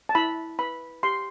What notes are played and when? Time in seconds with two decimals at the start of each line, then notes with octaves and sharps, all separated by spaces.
0.09 A5
0.15 E4 B5
0.59 B4 B5
1.03 G4 C6